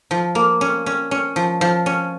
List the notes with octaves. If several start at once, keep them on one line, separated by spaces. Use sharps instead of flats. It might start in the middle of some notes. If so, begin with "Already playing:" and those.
F3
A#3
C#4
C#4
C#4
F3
F3
C#4